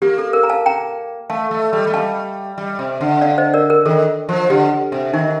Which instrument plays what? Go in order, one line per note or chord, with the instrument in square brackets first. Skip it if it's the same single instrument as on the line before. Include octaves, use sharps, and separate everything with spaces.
[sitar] A#3 [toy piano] G4
[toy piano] A4
A#4
A#5
F5 A5
G5 A#5
[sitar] A3 [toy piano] F5 A5
[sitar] A3
G3
A3
[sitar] G3 [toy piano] F5 A5
[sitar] G3
C3
D3
[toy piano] D5 F5
C5 D#5
A#4 D5
A#4
[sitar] D#3 [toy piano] A4
[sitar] F3
[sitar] D3 [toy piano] G4
[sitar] C3
[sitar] D#3 [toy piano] D#4